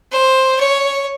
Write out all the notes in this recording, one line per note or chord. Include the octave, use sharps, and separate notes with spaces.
C5
C#5